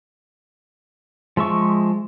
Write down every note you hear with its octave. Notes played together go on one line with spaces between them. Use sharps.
F3 G#3 E5 C#6